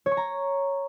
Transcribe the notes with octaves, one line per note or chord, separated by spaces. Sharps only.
C#5
C#6
A#5